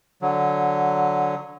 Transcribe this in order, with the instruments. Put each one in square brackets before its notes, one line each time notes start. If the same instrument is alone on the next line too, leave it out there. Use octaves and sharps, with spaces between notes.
[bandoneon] D3 F#3